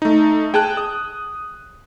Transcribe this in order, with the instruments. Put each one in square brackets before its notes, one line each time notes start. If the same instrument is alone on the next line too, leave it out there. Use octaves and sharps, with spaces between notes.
[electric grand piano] A3 D#4
[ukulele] G#4 [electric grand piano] G5 A5 F#6
[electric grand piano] D#6